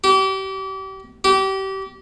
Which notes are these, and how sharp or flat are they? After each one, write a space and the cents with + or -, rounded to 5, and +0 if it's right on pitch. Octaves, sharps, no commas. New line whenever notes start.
G4 -35
G4 -30